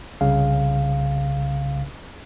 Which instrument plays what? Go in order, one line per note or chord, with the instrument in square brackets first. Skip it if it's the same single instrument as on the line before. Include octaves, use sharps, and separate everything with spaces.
[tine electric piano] C2 C#3 F5